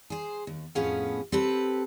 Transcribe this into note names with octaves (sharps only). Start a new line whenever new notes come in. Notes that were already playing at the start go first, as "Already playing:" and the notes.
G#4 C5
D#2
F2 A2 B3 C#4 G#4 F5
C4 G4 A4 B4